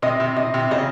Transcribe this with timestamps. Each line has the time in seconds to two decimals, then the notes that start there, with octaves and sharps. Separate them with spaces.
0.02 C3 D#5
0.20 C3
0.36 C3 D#5
0.54 C3
0.71 C#3 D#5